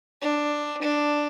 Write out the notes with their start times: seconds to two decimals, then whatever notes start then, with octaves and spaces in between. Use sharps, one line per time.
0.21 D4
0.82 D4